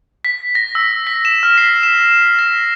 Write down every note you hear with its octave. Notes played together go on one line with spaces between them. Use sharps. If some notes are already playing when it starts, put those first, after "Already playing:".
B6
A#6
E6
B6
E7
F6
C7
E7
A#6